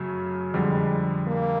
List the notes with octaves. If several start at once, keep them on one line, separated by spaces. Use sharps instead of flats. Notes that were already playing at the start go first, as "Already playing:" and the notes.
Already playing: F#2 C#3 F#3 A3
F2 D3 G3 G#3
A#3